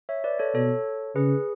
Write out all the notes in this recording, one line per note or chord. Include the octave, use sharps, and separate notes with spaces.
C#5 E5
B4 D5
A4 C#5
B2 A4 C#5
C#3 G#4 B4